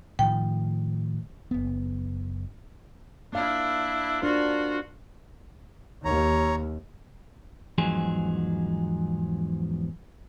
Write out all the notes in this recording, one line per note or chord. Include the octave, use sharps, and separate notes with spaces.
A2 D#3 F3 G5
F#1 B3
A#3 D4 E4 F5
D4 F4 F#4 A#4 C5
D#2 C#5 A#5
E2 G#2 F3 F#3 D#4 G#4